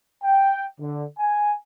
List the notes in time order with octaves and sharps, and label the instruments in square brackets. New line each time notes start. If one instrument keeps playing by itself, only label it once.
[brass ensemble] G5
D3
G#5